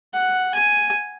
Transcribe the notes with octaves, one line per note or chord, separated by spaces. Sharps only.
F#5
G#5